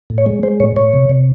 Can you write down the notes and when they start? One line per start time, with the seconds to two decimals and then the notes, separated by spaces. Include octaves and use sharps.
0.10 A2
0.18 C#5
0.26 G#3
0.43 G#3 C5
0.60 A2 C#5
0.76 A2 C#5
0.93 C3
1.09 C3